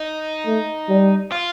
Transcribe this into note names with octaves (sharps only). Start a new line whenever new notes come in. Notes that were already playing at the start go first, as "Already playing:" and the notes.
Already playing: D#4
A3
G3
F4